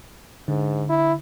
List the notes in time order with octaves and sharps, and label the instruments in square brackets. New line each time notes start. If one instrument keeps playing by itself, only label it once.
[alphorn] G#2 [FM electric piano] D3
[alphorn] E4